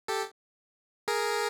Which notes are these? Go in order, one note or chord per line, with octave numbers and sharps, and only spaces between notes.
G4 A4
G#4 A#4